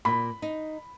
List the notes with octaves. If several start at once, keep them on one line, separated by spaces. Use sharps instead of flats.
A#2 B5
D#4